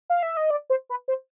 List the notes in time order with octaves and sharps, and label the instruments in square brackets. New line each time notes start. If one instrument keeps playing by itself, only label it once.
[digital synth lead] F5
E5
D#5
D5
C5
B4
C5